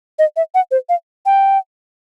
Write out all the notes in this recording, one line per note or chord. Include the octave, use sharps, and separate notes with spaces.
D#5
E5
F#5
C5
F5
G5